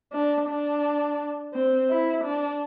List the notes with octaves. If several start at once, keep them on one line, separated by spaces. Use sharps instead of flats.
D4
D4
C4
E4
D4